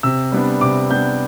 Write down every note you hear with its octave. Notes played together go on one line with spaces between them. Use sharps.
C3 E6
G3 B3 D4
C3 D6
G3 B3 D4 G6